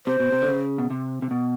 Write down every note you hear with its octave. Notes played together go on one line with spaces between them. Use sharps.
C3 C5
B2
C3
D3
C#3
B2
C3
C3
B2